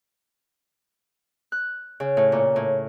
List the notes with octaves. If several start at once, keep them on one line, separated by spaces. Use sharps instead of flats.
F#6
C#3
A2
A#2
A2